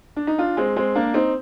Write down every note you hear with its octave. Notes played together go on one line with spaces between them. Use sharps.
D4
D#4
D4 F4
G#3 C4
G#3 C4
A#3 D4
C4 D#4